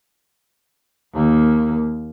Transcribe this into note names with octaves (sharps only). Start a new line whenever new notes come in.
D#2 A#3